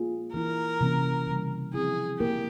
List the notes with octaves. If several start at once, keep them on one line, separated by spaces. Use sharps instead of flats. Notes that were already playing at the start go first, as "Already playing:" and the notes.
Already playing: A#3 F4 G#4
E3 A#3 E4 A#4
C3 E3 A#3 C#4
C#3 E3 G3
F3 C4 E4 G#4
A#3 E4 G4 A#4